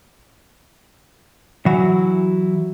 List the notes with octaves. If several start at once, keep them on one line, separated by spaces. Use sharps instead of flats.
E3 F#3 E4 F#4